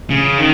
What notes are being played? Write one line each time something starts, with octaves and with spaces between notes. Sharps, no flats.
C#3
D#3